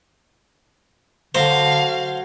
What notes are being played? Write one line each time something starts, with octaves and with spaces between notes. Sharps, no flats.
D3 F#3 C5 F5